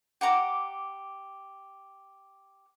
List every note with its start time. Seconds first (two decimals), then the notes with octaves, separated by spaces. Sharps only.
0.21 G4 F#5 A#5 D6